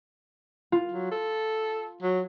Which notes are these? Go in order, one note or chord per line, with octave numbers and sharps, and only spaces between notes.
F4
F#3
A4
F#3